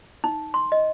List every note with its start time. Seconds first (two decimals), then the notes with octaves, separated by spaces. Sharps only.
0.24 D#4
0.54 C6
0.72 D#5